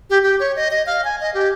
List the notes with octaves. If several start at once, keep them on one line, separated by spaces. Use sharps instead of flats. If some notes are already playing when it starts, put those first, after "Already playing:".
G4
G4
C#5
D#5
D#5
F5
G#5
D#5
G4